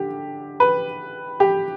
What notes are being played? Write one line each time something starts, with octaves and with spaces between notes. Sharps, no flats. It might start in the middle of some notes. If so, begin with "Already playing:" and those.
Already playing: D3 G4
B4
G4